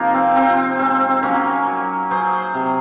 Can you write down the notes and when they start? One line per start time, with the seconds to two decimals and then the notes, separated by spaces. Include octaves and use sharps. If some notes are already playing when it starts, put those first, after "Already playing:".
Already playing: C3 F3 A#3 D#4 F4
0.14 C4
0.36 F3 C4
0.79 G#3 C4
1.23 F#3 A#3 C#4
1.67 F#3
2.10 F#3 G#4 C5
2.54 C3